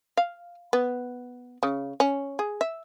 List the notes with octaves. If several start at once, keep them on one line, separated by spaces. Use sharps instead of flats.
F5
B3
C#3
C#4
G#4
E5